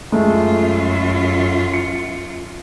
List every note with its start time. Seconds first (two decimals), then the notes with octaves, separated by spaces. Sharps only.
0.12 F#2 G#3 A3 F4
1.73 C#7